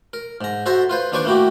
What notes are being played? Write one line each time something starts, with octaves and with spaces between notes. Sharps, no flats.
A#4
G#2 A#5
F#4 A4 C5 E5 A#5
F4 B4 C5
D#2 D4 B4 C5 C#6 D6
A3 A#3 E4 F#4 G4